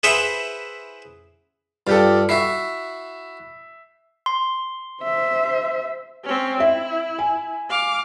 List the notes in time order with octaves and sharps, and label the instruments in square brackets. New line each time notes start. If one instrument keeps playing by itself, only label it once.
[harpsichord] E4 G#4 B4 C5 E5 F#5
[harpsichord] G2 [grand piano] F4 G4 A4
[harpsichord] E4 F#4 [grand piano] E5 C7
[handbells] C6
[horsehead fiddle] C5 E5
[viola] C4 C#4
[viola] E4 [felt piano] E5
[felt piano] G#5
[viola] F5 D6